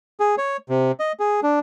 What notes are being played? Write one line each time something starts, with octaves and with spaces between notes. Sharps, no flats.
G#4
C#5
C3
D#5
G#4
D4